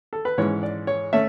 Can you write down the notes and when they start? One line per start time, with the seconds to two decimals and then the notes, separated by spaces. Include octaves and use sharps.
0.13 A4
0.25 B4
0.38 G#2 E3 G#3 C#4 C#5
0.63 D5
0.87 C#5
1.13 A3 C#4 E5